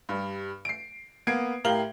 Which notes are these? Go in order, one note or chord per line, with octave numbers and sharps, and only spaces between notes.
G2 G3
C7 D7
A#3 B3 G#6 C7 D7
A2 G4 A#4 F5 F#7 G7